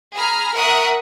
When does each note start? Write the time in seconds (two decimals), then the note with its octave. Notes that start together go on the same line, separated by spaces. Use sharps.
0.15 G#4 A#5 B5 F6
0.56 A#4 E5 F#5 C#6 D#6 F#6